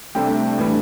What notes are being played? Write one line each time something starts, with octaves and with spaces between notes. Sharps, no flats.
C3 G3 A3 C4 D4 G4
A2 E3 G3